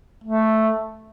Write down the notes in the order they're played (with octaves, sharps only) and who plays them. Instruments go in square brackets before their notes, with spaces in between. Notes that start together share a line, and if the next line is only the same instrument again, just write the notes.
[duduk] A3